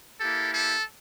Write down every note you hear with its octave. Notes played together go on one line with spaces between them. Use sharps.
A#3 E4 G4 A4
A4